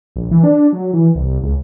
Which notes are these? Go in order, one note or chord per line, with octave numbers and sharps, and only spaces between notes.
A#1
E3
D4
F#3
E3
C2
C#2